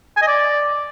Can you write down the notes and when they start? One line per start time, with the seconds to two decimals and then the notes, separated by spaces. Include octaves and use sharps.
0.17 G#5
0.22 D#5
0.27 D5